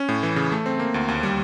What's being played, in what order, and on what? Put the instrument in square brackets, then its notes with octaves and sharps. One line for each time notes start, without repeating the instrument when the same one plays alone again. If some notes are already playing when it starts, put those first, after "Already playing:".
Already playing: [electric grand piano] C#4
A2
E3
C#3
A3
C4
A#3
D2
D#2
G3